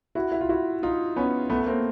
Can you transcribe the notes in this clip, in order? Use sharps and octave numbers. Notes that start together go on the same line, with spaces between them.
E4 F#4
E4
F4
E4 F#4
D#4 F4
B3 C#4
A3 B3
B3
A#3 C4